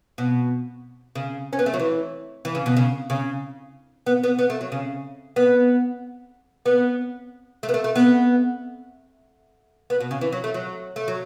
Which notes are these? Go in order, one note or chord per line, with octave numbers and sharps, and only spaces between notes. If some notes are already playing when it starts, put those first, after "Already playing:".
B2
C#3
C#4
B3
A3
F#3
E3
E3
C#3
B2
C#3
C#3
B3
B3
B3
A3
F#3
C#3
B3
B3
A3
B3
A3
A3
B3
B3
B2
C#3
E3
F#3
A3
F#3
A3
F#3